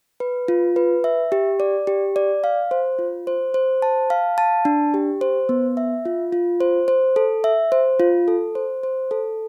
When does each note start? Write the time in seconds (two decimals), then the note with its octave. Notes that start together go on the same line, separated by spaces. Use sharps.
0.20 B4
0.48 F4
0.76 B4
1.04 E5
1.32 G4
1.60 D5
1.87 G4
2.16 D5
2.44 F5
2.71 C5
2.99 F4
3.27 C5
3.54 C5
3.82 A5
4.10 F5
4.38 A5
4.65 D4
4.94 G4
5.21 C5
5.49 B3
5.77 E5
6.05 F4
6.32 F4
6.61 C5
6.88 C5
7.16 A4
7.44 E5
7.72 C5
8.00 F4
8.28 A4
8.55 C5
8.83 C5
9.11 A4